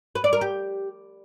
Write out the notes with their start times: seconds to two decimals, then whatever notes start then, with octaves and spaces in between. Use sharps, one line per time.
0.15 B4
0.24 D5
0.33 A#4
0.41 G4